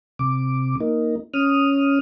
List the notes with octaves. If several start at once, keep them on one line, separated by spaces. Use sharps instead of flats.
C3 D6
A#3 D#4
C#4 D#6 F6